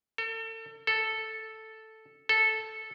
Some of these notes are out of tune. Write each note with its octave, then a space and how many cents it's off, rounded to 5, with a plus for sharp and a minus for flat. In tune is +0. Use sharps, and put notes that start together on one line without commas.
A4 +35
A4 +0
A4 -5